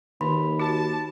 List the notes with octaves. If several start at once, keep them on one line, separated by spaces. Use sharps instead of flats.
D#2 D#3 B5
F#4 A5